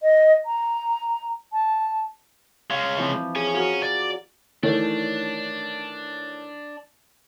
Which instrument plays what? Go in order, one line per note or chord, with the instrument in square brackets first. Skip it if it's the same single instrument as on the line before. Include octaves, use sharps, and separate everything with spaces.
[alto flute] D#5
A#5
A5
[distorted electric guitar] G#3 C#4 [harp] F5
[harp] E3 F3 C4
[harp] G#4 [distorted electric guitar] C#5 G#5
[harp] F4 F#4 A#4
[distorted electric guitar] D5
[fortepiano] D#3 [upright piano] E3 A3 C#5 [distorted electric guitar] D4